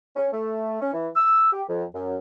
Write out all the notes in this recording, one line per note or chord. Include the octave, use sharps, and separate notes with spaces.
C#4
A3
C#4
E3
E6
G4
F2
F#2